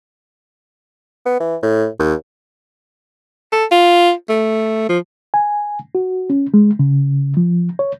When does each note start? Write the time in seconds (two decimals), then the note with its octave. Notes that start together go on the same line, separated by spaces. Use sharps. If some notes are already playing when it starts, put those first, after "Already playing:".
1.26 B3
1.40 E3
1.63 A2
1.99 D#2
3.52 A4
3.71 F4
4.29 A3
4.89 F3
5.34 G#5
5.95 F#4
6.30 C#4
6.54 G#3
6.79 C#3
7.37 F3
7.79 C#5